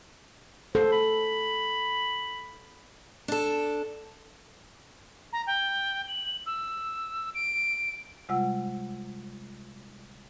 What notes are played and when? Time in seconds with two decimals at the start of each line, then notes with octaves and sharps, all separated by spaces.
0.75 A4 C5
0.92 B5
3.28 D4 A4
5.33 A#5
5.47 G5
6.08 F#7
6.46 E6
7.35 D7
8.29 C3 G3 G#3 F4 F#5 E6